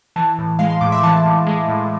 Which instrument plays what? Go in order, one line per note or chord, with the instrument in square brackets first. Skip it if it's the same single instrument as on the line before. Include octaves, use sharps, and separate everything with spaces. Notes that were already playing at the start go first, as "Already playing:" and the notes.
[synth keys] E3 A5
A2
G#3 F5
C6
A2 D6
E5
E3 A5
A2
G#3
A2